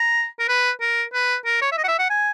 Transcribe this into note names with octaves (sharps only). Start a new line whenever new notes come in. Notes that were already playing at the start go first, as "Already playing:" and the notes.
Already playing: A#5
A#4
B4
A#4
B4
A#4
C#5
E5
D#5
F#5
E5
F#5
G#5